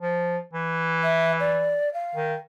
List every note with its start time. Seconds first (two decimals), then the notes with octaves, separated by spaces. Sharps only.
0.01 F3
0.53 E3
1.04 E5
1.40 D5
1.94 F5
2.15 D#3